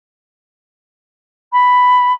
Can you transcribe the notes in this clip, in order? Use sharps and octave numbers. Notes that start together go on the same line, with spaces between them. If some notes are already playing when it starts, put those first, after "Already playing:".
B5